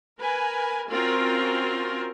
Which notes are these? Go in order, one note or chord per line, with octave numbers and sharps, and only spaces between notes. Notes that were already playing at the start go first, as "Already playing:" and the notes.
A#4 B4 G#5
C4 C#4 F4 F#4 A#4